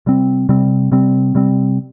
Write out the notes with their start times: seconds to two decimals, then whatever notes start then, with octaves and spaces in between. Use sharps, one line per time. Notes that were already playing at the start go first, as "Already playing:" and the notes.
0.06 C3 G3 C4
0.49 C3 G3 C4
0.92 C3 G3 C4
1.35 C3 G3 C4